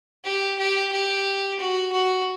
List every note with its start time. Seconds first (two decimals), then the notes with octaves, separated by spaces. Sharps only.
0.24 G4
0.58 G4
0.92 G4
1.59 F#4
1.92 F#4